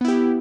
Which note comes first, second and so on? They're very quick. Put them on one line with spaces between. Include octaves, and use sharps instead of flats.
B3 E4 G4